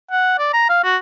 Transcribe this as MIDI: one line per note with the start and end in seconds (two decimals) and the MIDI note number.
0.11 0.37 78
0.39 0.49 74
0.53 0.67 82
0.70 0.79 77
0.84 0.96 66